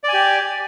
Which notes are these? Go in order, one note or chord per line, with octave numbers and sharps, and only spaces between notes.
G4 D5 G#5